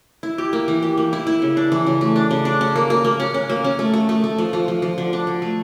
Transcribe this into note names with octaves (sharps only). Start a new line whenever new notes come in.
E4
G4
A#3
E3
G4
A#3
E4
E4
C#3
D4
E3
C#3
A3
D4
C#3
D4
C#4
A#3
A#3
A#3
C#4
C#4
A#3
C#4
A3
A3
A3
A3
F3
F3
F3
F3
D3
D4
D3
A3